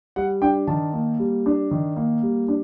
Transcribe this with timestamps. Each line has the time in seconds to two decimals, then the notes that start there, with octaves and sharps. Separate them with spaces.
0.16 G3 F#5
0.42 D4 G5
0.67 D#3 A5
0.93 A#3
1.19 G3
1.46 D4
1.71 D#3
1.96 A#3
2.23 G3
2.48 D4